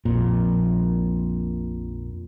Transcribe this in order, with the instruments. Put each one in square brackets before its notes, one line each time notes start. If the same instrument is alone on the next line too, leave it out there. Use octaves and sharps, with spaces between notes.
[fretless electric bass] A#1 F2 A#2